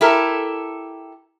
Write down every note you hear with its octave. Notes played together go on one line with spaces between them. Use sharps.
E4 G4 A4 A#4